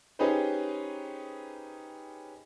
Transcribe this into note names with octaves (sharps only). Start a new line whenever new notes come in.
C#4 D#4 G4 G#4 B4 C5